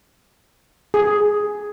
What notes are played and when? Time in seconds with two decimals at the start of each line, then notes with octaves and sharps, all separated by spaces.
0.94 G#4